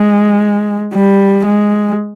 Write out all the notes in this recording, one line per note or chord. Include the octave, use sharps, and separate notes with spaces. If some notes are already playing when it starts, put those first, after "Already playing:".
Already playing: G#3
G3
G#3